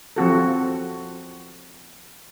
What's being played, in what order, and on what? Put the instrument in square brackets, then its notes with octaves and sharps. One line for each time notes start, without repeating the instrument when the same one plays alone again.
[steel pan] F3 C4 F#4 A4